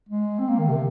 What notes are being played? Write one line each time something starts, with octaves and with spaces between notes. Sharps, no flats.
G#3
C4
A#3
D#3
C3